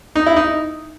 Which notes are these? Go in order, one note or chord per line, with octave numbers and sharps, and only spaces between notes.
D#4
E4
D#4